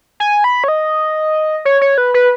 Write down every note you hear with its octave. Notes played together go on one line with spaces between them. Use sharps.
G#5
B5
C#5
D#5
C#5
C#5
B4
B4